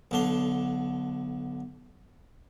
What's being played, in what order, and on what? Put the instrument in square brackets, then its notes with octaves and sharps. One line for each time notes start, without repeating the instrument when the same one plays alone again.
[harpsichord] B1 D3 C6